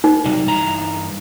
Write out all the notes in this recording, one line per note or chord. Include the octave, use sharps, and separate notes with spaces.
D#4
C3 F#3 G3
G2 E3 A#5